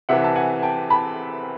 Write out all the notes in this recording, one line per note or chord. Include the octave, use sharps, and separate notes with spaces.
C2 C3 E3 E5 F#5
A5
F#5 G#5
G5 A5
A5 B5